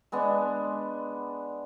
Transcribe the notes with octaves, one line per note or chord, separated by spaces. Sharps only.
G#3 B3 D4